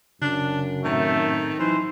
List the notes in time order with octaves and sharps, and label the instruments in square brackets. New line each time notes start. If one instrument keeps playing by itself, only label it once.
[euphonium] F#2 [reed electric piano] C#3 [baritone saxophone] D4
[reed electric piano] A2 C4 E5 [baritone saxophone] D#3 [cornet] A3
[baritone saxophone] E3 [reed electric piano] F#3 [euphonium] D#4 [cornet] C5